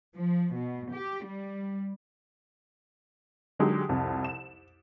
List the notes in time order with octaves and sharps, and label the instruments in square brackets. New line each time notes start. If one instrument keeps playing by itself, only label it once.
[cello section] F3
B2
G4
G3
[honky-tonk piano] D3 F#3 G#3 D#4 G4
C2 F2
E7